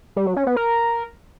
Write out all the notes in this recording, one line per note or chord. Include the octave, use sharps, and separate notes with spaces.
G3
F#3
C#4
B3
A#4